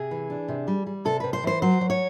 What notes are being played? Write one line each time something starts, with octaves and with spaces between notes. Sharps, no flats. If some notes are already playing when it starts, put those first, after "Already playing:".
Already playing: C3 G#4
E3
D4
C3
G3
G3
C3 A4
C3 B4
C5
E3 C5
F#3 C5
F#3
C#5